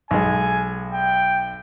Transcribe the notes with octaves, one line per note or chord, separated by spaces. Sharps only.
B1 G#3 G#5
G5